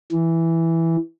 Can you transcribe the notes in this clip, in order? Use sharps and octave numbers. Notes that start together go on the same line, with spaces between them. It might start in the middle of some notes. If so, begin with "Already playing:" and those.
E3